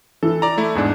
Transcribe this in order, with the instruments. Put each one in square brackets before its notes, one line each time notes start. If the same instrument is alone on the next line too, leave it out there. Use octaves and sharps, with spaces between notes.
[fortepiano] E3 [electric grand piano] A4
[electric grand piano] D5 A#5
A3 E4
E2 G#2 D4